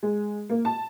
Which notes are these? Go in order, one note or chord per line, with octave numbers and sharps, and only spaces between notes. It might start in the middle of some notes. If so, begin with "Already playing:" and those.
G#3
A#3
A5